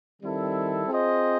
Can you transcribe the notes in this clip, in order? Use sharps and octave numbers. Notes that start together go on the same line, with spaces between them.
D#3 G3 C4 E4 A4
C4 F4 G#4 C5 D#5